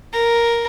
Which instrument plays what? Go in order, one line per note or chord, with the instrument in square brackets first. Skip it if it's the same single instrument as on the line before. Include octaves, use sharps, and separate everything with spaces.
[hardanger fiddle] A#4